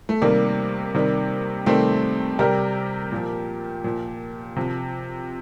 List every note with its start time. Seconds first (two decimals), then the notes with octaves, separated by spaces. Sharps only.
0.09 A3
0.21 C3 D#3 G3 A#3
0.94 C3 D#3 G3
1.66 C3 D#3 G3 A3 C4
2.39 C3 G3 G4 A#4
3.12 A#2 F3
3.84 A#2 F3
4.56 C3 F3